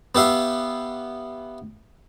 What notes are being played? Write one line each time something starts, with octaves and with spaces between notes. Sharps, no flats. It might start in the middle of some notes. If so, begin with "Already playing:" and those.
B3 G4 E5 F5